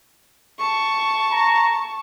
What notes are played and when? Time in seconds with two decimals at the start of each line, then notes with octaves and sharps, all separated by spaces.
0.59 A5 C#6
1.32 A#5